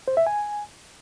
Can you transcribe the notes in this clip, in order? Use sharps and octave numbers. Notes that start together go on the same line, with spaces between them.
C5
E5
G#5